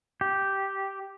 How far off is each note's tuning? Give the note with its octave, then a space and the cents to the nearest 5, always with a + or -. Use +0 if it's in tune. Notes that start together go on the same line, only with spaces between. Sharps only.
G4 -5